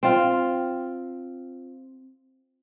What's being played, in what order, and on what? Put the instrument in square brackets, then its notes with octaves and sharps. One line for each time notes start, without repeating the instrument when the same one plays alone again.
[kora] C4 F4